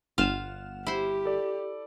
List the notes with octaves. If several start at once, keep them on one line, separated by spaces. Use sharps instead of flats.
G1 F4 F5 F#5 F6 E7
E4 G4 C5
A4 D5